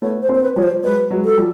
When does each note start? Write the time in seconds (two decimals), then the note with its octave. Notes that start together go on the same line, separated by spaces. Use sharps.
0.02 A3 B3 C#5
0.22 C5
0.29 A#3 C4
0.35 C5
0.43 B4
0.56 F3 G3 C#5
0.63 C5
0.83 F#3 G#3 B4
1.10 F#3 G#3
1.25 F#3 A4
1.37 F3 G3